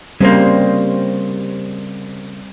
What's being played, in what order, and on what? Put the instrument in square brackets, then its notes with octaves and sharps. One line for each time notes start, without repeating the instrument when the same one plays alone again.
[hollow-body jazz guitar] C#3 A#3 [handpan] G3 C4 C5